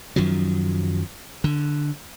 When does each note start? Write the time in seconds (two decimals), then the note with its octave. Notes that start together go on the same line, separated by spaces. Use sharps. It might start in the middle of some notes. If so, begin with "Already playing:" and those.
0.16 F#2 D#3 F3 F#3
1.44 D3